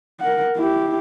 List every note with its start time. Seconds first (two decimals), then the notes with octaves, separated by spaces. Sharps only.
0.20 A#4 F#5
0.57 E4 G4